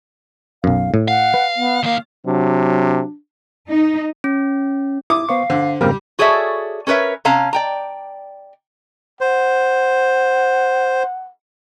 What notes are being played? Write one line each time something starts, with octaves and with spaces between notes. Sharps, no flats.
B1 F#2 F5
A2
F5 F#5
B4
B3
D#3 A#3 F5
C3 F#3 D4
D#4
C#4
E4 D6 D#6
B3 C5 F5 C#6
D3 C5
F2 G#2 C#3 G3 A#3 C4 G4 A#4
F#4 G#4 A4 C#5 D5 E5
C#4 A#4 B4 C#5 E5
C3 C#4 F5 A5 A#5
D5 G5 A#5
C5 F#5